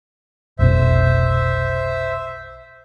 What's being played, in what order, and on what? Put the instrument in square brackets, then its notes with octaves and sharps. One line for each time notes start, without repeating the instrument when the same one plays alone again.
[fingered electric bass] F1 B1 B2 [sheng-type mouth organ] C5 E5